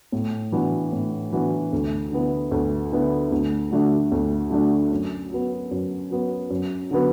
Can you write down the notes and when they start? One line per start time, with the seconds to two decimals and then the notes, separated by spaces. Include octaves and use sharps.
0.12 A2
0.52 E3 B3 D4 F#4
0.92 A2
1.32 E3 B3 D4 F#4
1.73 D2
2.12 D3 B3 E4
2.51 D2
2.92 D3 B3 E4
3.32 D2
3.71 D3 A3 D4 F#4
4.12 D2
4.51 D3 A3 D4 F#4
4.91 F#2
5.31 F#3 B3
5.71 F#2
6.11 F#3 B3
6.50 F#2
6.91 D3 F#3 B3